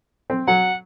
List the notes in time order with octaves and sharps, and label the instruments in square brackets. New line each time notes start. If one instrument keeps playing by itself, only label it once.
[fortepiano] C4
[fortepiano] F#3 [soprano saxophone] F#5